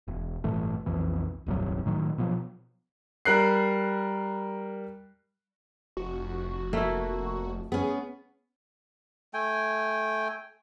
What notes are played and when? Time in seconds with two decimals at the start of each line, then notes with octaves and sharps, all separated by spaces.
0.08 E1
0.44 G1 A2 E3 A3
0.86 B1 F2 E3
1.46 D#1 C2 G2 F#3
1.86 A2 D#3 F#3
2.18 B2 F3 F#3
3.25 G3 A#4 F#6 C7
5.97 F1 F#4
6.73 A3 A#3 E4
7.72 B3 C#4 G#4
9.34 A3 G5 G#5